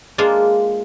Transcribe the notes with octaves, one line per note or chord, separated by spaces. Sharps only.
G#3 A#3 D4 F4